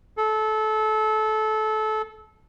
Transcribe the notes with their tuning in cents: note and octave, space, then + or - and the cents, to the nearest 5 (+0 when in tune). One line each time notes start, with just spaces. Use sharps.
A4 -25